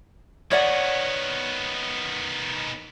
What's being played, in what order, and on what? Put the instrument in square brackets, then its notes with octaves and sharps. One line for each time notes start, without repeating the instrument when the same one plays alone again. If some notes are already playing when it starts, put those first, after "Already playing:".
[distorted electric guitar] D#3 B3 [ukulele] C#5 D5 F#5